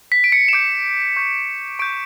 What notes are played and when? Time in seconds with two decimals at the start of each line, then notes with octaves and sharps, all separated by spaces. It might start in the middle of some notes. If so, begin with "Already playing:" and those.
0.12 B6
0.24 D7
0.32 C#7
0.48 E7
0.53 D6 G6 D7
1.16 C#6 G6
1.79 C#6 G6 D7